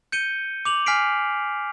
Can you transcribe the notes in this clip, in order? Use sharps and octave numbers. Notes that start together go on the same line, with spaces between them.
G6 C#7 D#7 G7
D6 F7 F#7
G#5 F6 B6 C7 D7